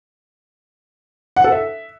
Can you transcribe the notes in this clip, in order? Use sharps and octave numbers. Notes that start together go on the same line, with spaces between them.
F#5
A4
E5